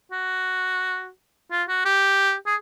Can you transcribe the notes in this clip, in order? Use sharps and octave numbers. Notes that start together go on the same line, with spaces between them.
F#4
F4
F#4
G4
G#4